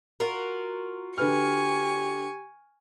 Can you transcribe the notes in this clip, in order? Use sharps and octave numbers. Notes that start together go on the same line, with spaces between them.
F4 F#4 A#4
D3 G4 B4 G#5 C#6 F6